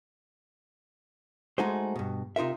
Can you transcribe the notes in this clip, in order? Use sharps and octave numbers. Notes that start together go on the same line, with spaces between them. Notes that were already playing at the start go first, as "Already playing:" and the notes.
G#3 A3 D#4 F#4 G#4 C5
G2 B2
C3 D#4 F4 A#4 E5